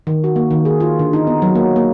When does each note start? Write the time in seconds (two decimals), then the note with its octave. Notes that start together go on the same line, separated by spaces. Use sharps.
0.07 D#3
0.24 F#4
0.36 A#3
0.51 D#3
0.65 G#4
0.80 F4
0.99 D3
1.13 D#4
1.27 B3
1.42 F#3
1.55 A#3
1.76 A#3